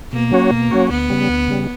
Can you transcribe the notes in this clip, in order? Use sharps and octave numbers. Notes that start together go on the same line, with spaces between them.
B2 A#3
F#3 C#4 F#4 C#5
B2
F#3 C#4 F#4 C#5
D2 B3
C#3 G3
D2
C#3 G3